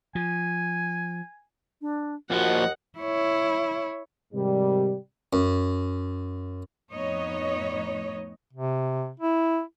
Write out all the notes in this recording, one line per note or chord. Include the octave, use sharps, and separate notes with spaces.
F3 G#5
D4
D#2 A#2 F3 F#4 D#5 F#5
E4 C#5
G#2 C3 D#3 G3
F#2
F2 A2 B3 D#4 C#5 D#5
C3
E4